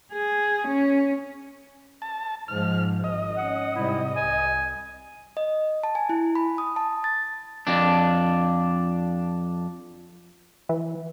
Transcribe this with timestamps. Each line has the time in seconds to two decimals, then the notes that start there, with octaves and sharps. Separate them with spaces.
0.12 G#4
0.68 C#4
2.02 A5
2.48 G#2 F3 G#3 F6
3.04 G#1 D#5
3.36 C#4 F#5
3.76 G#2 C3 G3 E4
4.16 C2 G#5
5.37 D#5
5.83 A5
5.95 G#5
6.09 E4
6.35 B5
6.58 D#6
6.76 A5
7.04 A6
7.67 F2 D4
10.69 E3